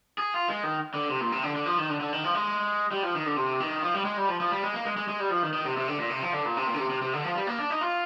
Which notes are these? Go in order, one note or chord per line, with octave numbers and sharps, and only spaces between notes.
G#4
F4
G#3
D#3
D3
C3
A#2
C3
D3
D3
F3
D#3
D3
D3
D#3
F3
G#3
G3
F3
D#3
D3
C3
D#3
F3
G3
G#3
G3
F3
F3
G3
G#3
A#3
G#3
G#3
G#3
G3
F3
D#3
D#3
C3
C3
D3
A#2
C3
F3
D3
A#2
C3
A#2
D3
C3
C3
C3
D3
F3
G3
A#3
D4
D#4
F4